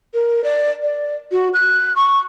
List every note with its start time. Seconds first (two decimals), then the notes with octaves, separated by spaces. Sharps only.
0.14 A#4
0.44 D5
0.82 D5
1.32 F#4
1.54 F#6
1.96 C#6